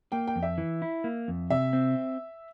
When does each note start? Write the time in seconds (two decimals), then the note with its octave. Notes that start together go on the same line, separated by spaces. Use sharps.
0.12 A#3 G5
0.27 G5
0.36 F2
0.43 E5
0.58 E3
0.82 E4
1.04 A#3
1.28 F2
1.50 C3 E5
1.73 C4